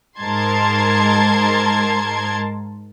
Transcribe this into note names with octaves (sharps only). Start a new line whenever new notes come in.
G#2 A#4 A5 C6 G#6